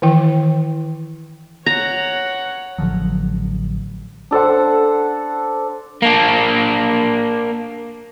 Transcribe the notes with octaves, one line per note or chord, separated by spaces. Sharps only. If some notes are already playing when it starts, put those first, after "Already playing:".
D#3 E3 E4 G5
C#5 F#5 A#5
A1 D3 F3 F#3
D4 A4 C5 F#5
A#3 D4